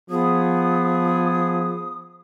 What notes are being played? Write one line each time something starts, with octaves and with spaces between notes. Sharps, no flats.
F3 B3 G#4 D#6